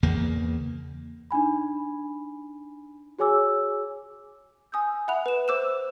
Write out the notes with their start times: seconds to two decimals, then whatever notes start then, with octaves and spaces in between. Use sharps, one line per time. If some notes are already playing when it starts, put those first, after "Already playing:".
0.03 E2 C#3 A#3
1.31 D4 D#4 G#5 B5
3.19 F#4 G#4 C#5 G#5 D6 E6
4.72 G#5 D#6 E6 G6
5.08 E5 F#5 B5 F#6 F7
5.26 B4 E7
5.48 C5 D6 E6 F#6 E7